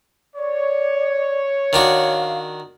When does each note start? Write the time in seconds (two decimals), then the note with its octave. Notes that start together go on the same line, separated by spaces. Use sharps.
0.37 C#5 D5
1.73 D#3 D4 F#4 F5